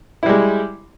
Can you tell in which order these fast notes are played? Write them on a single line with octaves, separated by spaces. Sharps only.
E4 G3 G#3